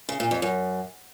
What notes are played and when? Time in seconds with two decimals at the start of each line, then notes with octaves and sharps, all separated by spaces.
0.09 C#3
0.20 A#2
0.31 F2
0.42 F#2